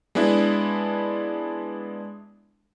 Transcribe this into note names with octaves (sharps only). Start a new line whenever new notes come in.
G#3 B3 D4 E4